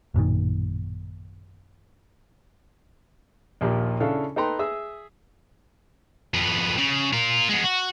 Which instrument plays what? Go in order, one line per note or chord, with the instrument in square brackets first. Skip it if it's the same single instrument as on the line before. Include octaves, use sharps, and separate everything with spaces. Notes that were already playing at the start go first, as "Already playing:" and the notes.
[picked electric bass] A1 F#2 A#2 D#3
[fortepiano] A#1 D#2 A#2 F3 G4
C#3 D4 E4 A4 F5
D#4 A4 B4 G5 A#5 C6
G#4 E5 D#6 E6
[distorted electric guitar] F2 B3
C#3
F4 A#4
G#3 B3
F#4